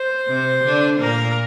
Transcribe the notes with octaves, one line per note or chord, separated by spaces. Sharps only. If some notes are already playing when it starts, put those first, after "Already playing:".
Already playing: C5
C3 C4
D3 D4
A#2 A#3 A#4